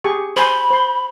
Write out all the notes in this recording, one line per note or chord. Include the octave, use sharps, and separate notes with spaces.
G4 G#4 C#6
C5 G#5 B5 C6
C5 C6